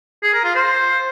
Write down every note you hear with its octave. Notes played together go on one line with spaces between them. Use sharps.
G#4
A#4
F4
C5